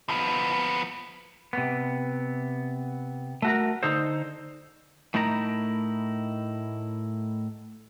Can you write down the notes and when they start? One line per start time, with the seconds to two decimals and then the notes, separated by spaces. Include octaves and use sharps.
0.09 F3 B3
1.53 C3 B3
3.42 A3 F#4 A#4
3.83 D3 D#4 A4 C5
5.14 A2 A3 D#4 E4 A#4 A#5